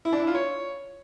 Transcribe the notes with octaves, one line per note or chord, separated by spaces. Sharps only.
E4
D4
E4
F4
C#5